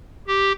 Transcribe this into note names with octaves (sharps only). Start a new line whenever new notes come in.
G4